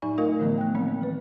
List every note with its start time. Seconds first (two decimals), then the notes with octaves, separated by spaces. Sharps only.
0.02 A2 F#3 D#4 D5 G#5 C#6
0.18 A3 F4 A#4 D#5 F5
0.39 A2 D3 E3 F3 A3 B3
0.58 G5 F#6
0.75 D#3 F3 G3 A#3 C4
1.01 E3 B4